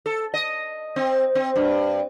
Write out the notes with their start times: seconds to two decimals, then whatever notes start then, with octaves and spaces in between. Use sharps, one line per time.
0.06 A4
0.34 D#5
0.96 C4
1.35 C4
1.56 G2